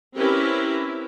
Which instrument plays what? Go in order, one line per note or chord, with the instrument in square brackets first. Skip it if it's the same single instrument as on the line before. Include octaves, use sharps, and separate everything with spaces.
[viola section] C4 C#4 E4 G4 A#4 B4